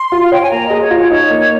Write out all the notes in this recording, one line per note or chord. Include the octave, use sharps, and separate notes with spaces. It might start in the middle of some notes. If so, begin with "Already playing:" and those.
Already playing: C6
F4
F5
C#5 G5
G#5
A#3 A#5
G#4 D#5
C#5
F4
C#5
D#4 C#5
A#3